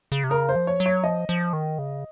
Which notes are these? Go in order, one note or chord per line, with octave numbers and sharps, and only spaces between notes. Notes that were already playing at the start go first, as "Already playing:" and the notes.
C#3
C3
C#3 A#4
C5
F3
C#5
F#3
C#5
F3 D#5
F3
D#3
C#3